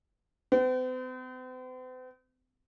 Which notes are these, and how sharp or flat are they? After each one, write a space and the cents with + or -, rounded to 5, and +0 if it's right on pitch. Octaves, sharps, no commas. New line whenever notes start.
C4 -45